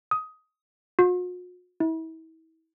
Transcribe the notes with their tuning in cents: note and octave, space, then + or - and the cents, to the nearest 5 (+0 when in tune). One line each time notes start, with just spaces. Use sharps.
D#6 +15
F#4 -45
E4 -35